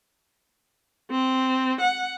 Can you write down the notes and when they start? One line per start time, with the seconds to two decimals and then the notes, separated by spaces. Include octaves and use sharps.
1.11 C4
1.81 F#5